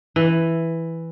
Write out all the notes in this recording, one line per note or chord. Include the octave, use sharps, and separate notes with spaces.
E3